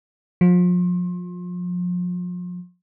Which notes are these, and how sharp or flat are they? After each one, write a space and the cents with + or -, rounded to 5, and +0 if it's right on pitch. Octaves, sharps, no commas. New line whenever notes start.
F3 +35